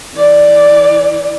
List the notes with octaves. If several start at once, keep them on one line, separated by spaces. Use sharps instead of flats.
E3 D5